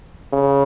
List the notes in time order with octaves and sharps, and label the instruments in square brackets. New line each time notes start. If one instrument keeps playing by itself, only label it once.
[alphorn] C#3